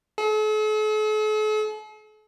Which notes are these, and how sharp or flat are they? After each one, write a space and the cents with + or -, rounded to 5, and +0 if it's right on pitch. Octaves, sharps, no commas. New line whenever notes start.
A4 -45